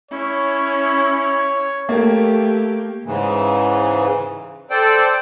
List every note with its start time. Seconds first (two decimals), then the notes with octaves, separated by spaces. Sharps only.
0.11 C#4 E4 C#5
1.89 A3 A#3 G4
3.06 G#2 C#3 E3
4.70 A4 C5 D5 G5